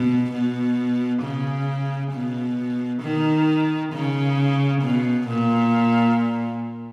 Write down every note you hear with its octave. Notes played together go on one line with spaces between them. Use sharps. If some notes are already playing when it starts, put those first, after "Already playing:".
Already playing: B2
B2
C#3
B2
D#3
C#3
B2
A#2